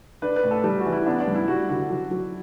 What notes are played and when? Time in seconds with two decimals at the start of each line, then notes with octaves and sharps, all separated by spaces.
0.22 D4 B4
0.36 B4
0.43 A2
0.51 A4
0.64 G3 A4
0.79 F#4
0.86 E3
0.92 E4
1.06 B3 D4
1.20 D4
1.27 G2
1.35 E4
1.48 G3 F#4
1.69 D3 F#4
1.90 F#3
2.11 F#3